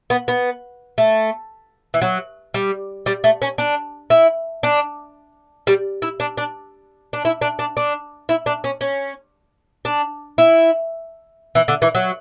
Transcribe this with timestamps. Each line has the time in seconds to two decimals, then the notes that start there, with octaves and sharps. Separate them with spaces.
0.10 B3
0.28 B3
0.98 A3
1.94 E3
2.02 F#3
2.54 G3
3.06 G3
3.24 A3
3.42 C#4
3.58 D4
4.10 E4
4.63 D4
5.67 G3
6.02 E4
6.20 D4
6.38 D4
7.13 D4
7.25 E4
7.42 D4
7.59 D4
7.77 D4
8.29 E4
8.46 D4
8.64 C#4
8.81 C#4
9.85 D4
10.38 E4
11.55 E3
11.68 D3
11.82 E3
11.95 F#3